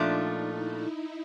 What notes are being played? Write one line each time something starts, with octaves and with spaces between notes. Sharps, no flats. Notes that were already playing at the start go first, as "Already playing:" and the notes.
Already playing: A#2 F3 A3 D4 D#4
E4